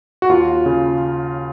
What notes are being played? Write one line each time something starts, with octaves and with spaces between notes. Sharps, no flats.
F#4
D#2 F4
C#3